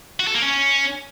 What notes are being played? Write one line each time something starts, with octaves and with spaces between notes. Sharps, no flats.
F#4
A4
A#3
C#4